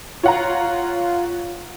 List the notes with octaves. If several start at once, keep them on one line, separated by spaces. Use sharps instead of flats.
F4 C#5 F#5 A#5